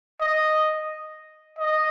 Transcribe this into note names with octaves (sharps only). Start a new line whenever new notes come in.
D#5
D#5